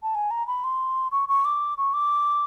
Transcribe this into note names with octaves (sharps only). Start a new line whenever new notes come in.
A5
G#5
A#5
B5
C6
C#6
C#6
D6
C#6
D6